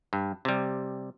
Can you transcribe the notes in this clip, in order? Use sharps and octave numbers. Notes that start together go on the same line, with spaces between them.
G2
C3 G3